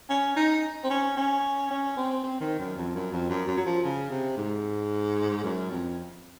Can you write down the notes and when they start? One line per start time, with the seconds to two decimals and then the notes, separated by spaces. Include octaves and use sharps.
0.10 C#4
0.36 D#4
0.84 C4
0.90 C#4
1.17 C#4
1.71 C#4
1.97 C4
2.24 C4
2.41 D#3
2.59 F#2
2.77 F2
2.95 F#2
3.12 F2
3.30 F#2
3.47 F#2
3.57 F#3
3.66 F3
3.84 C#3
4.10 C3
4.37 G#2
5.43 F#2
5.70 F2